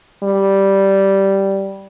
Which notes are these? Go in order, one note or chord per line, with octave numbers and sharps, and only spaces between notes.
G3